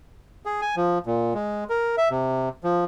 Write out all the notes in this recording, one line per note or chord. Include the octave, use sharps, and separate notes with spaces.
G#4
G#5
F3
A#2
G#3
A#4
E5
C3
F3